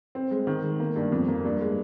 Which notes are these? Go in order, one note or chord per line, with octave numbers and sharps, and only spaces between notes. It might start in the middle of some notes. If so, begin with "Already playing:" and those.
C4
G#3
D#3
G#3
A#3
G2
F2
A#3
G2
G#3